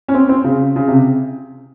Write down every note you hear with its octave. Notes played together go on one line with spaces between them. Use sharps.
C#4
C4
C4
C#3
C#3
C3